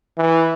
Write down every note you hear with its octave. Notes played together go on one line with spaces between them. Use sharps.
E3